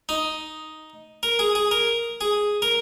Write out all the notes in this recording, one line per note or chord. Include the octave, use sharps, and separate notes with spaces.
D#4
A#4
G#4
G#4
A#4
G#4
A#4